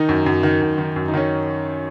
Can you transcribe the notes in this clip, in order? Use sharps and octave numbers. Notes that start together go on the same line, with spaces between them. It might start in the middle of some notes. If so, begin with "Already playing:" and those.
Already playing: D#3 D#4
F#2
F#2
D#3
F#2
D#3
F#2
D#4
D#3 C#4